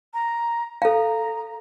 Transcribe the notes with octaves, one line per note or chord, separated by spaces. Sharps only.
A#5
A4 F5 A#5